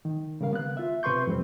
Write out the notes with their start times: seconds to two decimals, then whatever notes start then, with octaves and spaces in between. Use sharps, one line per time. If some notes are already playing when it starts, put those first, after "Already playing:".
0.05 D#3
0.41 C#3 G3 A#4 F5
0.53 B3 F#6
0.77 F4 E5
1.03 C3 B4 C6 C#6 G6
1.27 F2 G3 C4